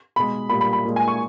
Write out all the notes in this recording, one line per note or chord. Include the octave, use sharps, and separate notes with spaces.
B2 G#3 B5
A#2 G3 B5
B5
B5
A#2 G#3
G#5
C#6